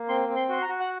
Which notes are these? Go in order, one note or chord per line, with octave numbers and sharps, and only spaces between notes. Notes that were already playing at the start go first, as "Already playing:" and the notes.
Already playing: A#3
C4 C6
C4
C6
F#4 C6
A#5
F#4
F#5